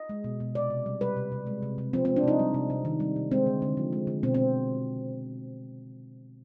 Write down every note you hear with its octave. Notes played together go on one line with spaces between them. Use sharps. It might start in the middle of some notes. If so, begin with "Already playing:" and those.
Already playing: D#5
G#3
B2
B2
C3 D5
C3
G3
G3 B4
C3
C3
G#3
C3
C3
F3 C4
G#3 C4
D4
C3 D#4
G3
C3
C3
D#3
G3
C3
G#3 C4
D3
D3
F3
G#3
D3
B2 C4
C4